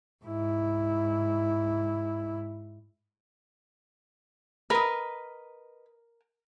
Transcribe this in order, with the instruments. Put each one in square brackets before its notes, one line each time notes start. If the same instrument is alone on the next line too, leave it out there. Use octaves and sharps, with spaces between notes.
[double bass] G#2 E4
[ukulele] A#4 [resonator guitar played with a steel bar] B4 D#5